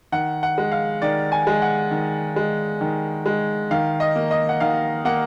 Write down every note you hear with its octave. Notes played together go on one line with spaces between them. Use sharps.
D#3 F#5
F#5
G#3
F5
D#3 D5
G#5
G#3
F#5
D#3
G#3
D#3
G#3
D#3 F5
D#5
A#3
D#5
F#5
D#3 F5
A#3 F#5